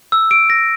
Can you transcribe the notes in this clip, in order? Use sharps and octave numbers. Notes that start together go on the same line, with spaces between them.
E6
D7
A#6